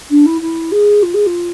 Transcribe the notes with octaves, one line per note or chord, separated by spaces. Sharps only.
D4
E4
E4
G#4
F4
G#4
F4